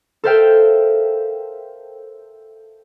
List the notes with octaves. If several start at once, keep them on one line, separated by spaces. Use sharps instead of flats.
A4 A#4 C5 E5 F5 G5